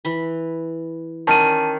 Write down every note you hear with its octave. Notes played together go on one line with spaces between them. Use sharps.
E3 B5
D#3 C#4 D5 A5 D#7